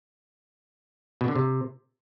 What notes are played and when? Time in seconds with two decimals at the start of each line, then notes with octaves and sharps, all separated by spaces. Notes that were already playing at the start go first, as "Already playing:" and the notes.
1.21 B2
1.28 D3
1.36 C3